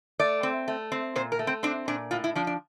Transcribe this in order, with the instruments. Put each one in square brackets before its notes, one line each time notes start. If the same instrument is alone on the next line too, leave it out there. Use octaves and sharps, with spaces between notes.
[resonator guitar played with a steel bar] A3 D5
C4
A3
C4
A#2 C5
A#4
A3
C4
C4 D4
A#2 D4
A2 F4
E4
F3 D4
D4